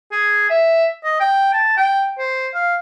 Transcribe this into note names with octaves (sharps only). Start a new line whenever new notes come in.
G#4
E5
D#5
G5
A5
G5
C5
F5